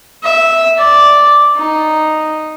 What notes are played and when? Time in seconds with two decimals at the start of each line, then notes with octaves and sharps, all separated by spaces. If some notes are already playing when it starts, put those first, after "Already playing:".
0.23 E5
0.78 D5
1.56 D#4